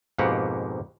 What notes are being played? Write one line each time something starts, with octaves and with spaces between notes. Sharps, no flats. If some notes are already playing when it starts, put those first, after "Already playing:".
F2 G#2 B2 A#3 G4 F#5